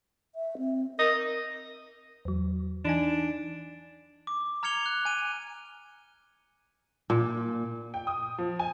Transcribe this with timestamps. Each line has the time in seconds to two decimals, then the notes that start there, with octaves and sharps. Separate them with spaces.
0.35 E5
0.58 C4
0.99 A#4 D#5
2.25 E2 F#3
2.85 E3 D4 D#4 G#5
4.27 D6
4.63 A#5 F6 G#6 C#7 F7 G7
4.86 F#6
5.05 G#5 D#7
7.10 A#2
7.94 G5
8.07 D#6
8.38 F3
8.59 G#5